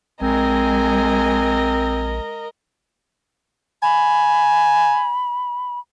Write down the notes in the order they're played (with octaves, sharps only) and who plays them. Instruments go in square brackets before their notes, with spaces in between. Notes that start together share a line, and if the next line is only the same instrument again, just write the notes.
[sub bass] A#1 [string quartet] G#3 G#5 [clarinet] C4 [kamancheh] A#4 D#5
[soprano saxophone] G#5 [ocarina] B5